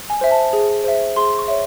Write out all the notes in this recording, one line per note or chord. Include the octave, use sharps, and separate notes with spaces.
G#5
C5 E5
A5
G#4
C5 E5
G#4 C6
C#6
C#5 E5